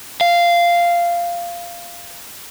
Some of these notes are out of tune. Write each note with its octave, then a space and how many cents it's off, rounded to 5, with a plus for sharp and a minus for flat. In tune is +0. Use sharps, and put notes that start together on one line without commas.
F5 -10